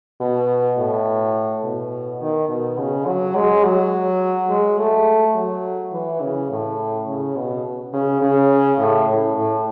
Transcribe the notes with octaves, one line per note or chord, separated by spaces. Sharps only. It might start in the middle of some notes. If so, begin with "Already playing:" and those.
B2
A2
B2
D#3
B2
C#3
F#3
G#3
F#3
G#3
A3
F#3
E3
C#3
A2
C#3
B2
C#3
C#3
A2
A2
A2